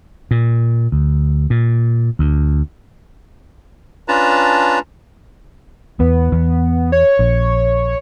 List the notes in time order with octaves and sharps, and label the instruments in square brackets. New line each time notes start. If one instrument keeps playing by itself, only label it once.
[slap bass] A#2
D2
A#2
D2
[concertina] C#4 D4 F4 B4 A5 A#5
[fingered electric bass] E2 [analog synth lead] B3
[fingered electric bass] E2
[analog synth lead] C#5
[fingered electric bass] A#1